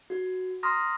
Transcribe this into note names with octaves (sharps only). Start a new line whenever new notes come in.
F#4
A#5 C6 D#6 F6 A#6